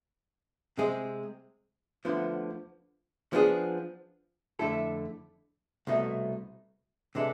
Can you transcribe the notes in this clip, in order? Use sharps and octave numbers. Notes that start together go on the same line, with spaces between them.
C3 G#3 C4 G#4
D2 D3 F3 B3
F3 B3 D4 G#4
F2 D3 A3 E4 A4
C2 B2 A3
C3 E3 G#3 D4 A4